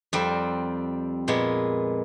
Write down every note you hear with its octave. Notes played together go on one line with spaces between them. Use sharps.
F2 G3 C4
A#2 G#3 B3